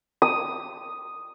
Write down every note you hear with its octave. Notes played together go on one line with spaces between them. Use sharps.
D#6